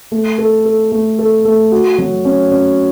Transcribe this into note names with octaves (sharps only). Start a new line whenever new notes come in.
A3
A4
A4
A3
A4
A3
F#4
F#3
C#4
C#4